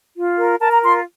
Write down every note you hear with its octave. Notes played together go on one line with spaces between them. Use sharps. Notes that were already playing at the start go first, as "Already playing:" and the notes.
F4
A#4
A#4 A5
A#5
F4 C6